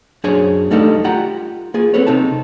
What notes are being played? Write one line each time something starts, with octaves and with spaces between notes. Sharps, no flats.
F#2 D4 G#4 C5 C#5 G#5
G3 A3 D4 D#4 A4 F5
F4 G4 F#5 A#5
A#3 F4 G#4
B3 C4 A4 B4 C#5
C3 C4 D#4 A5